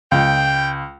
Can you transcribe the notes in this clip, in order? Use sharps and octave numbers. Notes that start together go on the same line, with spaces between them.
C#2 G5